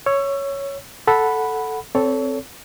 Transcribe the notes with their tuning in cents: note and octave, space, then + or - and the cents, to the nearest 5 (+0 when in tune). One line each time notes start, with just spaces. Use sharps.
C#5 +0 E6 +30
A4 +0 F#5 +0 B5 +0
C4 +0 A4 +0 C#5 +30